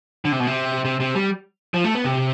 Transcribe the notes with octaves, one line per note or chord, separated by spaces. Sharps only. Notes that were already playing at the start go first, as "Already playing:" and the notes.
D3
C3
B2
C3
C3
C3
G3
F3
A3
B3
C3